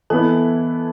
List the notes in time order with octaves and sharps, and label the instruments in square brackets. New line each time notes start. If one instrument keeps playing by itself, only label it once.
[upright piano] E3 B3 E4 [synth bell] A4 A5